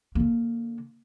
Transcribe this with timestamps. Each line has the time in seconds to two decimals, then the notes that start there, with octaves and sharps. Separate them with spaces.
0.15 D3 A#3